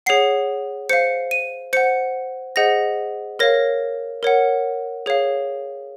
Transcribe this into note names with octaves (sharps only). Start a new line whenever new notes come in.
G#4 C#5 F#5 C7
C5 F5 C#7
D#7
C5 F#5 C#7
G#4 C5 D#5 F#5 A#6
A#4 C#5 F5 A#6
A#4 C#5 F#5
G#4 C#5 F5